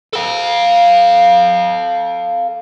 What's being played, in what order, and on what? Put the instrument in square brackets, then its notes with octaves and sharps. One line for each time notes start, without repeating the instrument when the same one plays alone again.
[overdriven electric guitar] A4 F5